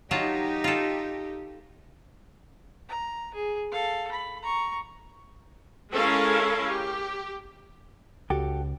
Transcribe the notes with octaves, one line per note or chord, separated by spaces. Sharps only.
F#3 D#4 F4 G4 A5
F4 A4
A#5
G#4
A4 F5
B5
A#5 C#6
G#3 C#4 E4 A4 A#4 F5
G4
C#2 F#4 G4 A4